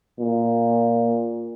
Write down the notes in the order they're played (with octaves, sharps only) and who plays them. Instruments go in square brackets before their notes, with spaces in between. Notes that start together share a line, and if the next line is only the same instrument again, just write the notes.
[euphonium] A#2